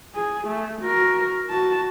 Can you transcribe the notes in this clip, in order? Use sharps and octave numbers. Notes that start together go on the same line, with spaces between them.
G#4
A3
F#4 A#4
F#4 A5